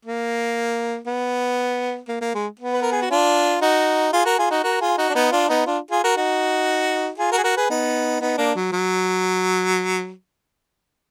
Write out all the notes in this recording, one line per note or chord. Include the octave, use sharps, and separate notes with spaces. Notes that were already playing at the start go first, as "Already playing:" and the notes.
A#3
B3
A#3
A#3
G#3
B3
B4
A#4
G#4
F#4
D4 F4
D#4 F#4
F4 G#4
F#4 A#4
F4 G#4
D#4 F#4
F#4 A#4
F4 G#4
D#4 F#4
D4
B3 D#4
D4 F4
B3 D#4
D4 F4
F4 G#4
F#4 A#4
D#4 F#4
F4 G#4
F#4 A#4
G#4
F#4 A#4
G#4 B4
B3 D#4
B3 D#4
A#3 D4
F#3
F#3